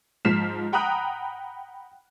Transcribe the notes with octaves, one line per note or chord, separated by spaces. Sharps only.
G#2 F3 F6 B6 C7 E7
F#5 G5 A#5 B5 D#6 F#6